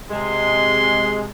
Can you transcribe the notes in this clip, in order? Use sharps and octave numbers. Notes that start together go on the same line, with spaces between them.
C3 G#3 C6